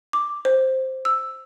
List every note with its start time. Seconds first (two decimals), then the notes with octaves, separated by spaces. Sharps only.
0.13 D6
0.45 C5
1.05 E6